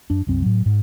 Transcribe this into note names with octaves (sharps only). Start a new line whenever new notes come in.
F#2 D4
C2 F#2 C4
A2 F#3
G#2